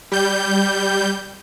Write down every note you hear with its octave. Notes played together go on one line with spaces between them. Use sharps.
G3 G6